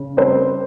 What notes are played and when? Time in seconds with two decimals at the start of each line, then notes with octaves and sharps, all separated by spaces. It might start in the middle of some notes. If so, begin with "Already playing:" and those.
Already playing: C#3
0.17 G3 C4 C5